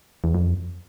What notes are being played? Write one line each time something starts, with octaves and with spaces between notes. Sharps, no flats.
E2
F2